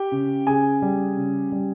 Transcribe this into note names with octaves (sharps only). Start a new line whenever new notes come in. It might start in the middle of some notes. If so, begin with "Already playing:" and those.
Already playing: G4 G5
C#3
C#3 G#4 G#5
G3
C#3
G3